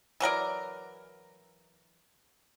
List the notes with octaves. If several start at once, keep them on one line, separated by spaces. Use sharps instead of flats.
E3 F#3 A#4 D5